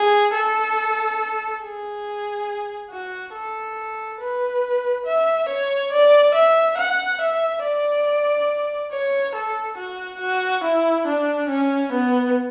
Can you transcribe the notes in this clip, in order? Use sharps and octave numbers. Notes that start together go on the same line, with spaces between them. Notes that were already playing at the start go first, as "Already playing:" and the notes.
Already playing: G#4
A4
G#4
F#4
A4
B4
E5
C#5
D5
E5
F#5
E5
D5
C#5
A4
F#4
F#4
E4
D4
C#4
B3